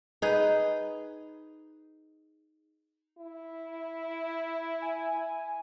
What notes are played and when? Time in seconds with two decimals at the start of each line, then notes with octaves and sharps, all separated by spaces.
0.22 D#4 G#4 B4
3.18 E4
4.82 G#5